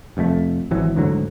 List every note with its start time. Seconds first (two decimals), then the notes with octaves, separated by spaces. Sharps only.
0.17 F1 F2 C3 A3
0.71 G#1 G#2 E3 F#3
0.95 D2 G#2 D3 F#3